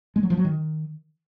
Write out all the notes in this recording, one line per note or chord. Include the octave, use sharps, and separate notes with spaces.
G#3
F#3
F3
F#3
D#3